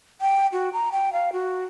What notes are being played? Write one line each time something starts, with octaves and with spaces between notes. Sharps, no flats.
G5
F#4
A#5
G5
F5
F#4